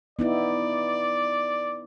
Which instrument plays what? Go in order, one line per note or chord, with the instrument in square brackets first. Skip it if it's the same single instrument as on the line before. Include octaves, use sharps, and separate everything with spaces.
[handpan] B3 D#4 E4 [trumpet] D5